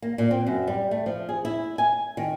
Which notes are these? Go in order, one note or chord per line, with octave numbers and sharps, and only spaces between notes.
A#3
A#2
C4
F#2
G3
A3
F3
G#4
E4
G#5
D#3